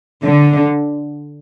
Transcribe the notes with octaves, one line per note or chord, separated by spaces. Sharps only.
D3